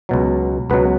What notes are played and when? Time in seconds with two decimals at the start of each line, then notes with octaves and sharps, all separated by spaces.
0.09 C#2 B2 F#3
0.70 C#2 B2 F#3 B3 B4